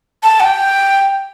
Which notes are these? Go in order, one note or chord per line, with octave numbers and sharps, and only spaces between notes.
A5
F#5
G5